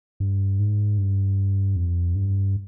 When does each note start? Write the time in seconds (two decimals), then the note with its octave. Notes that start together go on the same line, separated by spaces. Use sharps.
0.20 G2
0.59 G#2
0.98 G2
1.76 F2
2.15 G2